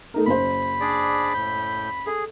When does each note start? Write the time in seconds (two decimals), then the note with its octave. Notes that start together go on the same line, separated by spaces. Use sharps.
0.14 A3 D#4 A#4
0.26 F#1 C5 B5
0.81 D4 G#4 D5
1.34 A2 G6
2.06 G#4 A4